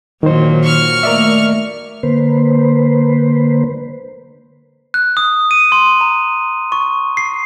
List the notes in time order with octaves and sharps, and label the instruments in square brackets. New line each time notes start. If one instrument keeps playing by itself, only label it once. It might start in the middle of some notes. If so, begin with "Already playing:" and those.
[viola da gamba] A#2 F#3 [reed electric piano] D#3 C5
[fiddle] C#6 F6
[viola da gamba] D#3 A3 A#3 [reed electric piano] A#4 D5 E5
[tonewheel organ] D3 A#3 B4 C5
[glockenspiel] F#6
D#6
D#7
C6
A#5
C#6
C7